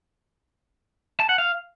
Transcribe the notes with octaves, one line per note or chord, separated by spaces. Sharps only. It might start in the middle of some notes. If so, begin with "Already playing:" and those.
A5
F#5
F5